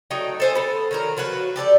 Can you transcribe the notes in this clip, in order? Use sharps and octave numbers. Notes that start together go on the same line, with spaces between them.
F#3 A3 D#4 G5
A4 C5 G#5
B3 A4
D#3 F#3 A#4
F3 F#3 F#4 B4
G4 A4 C#5 D5